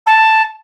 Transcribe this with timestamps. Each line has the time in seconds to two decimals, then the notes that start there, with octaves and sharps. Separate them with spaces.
0.06 A5